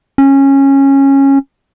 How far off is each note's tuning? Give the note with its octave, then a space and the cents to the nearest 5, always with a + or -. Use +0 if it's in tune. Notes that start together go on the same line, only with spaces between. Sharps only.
C#4 -15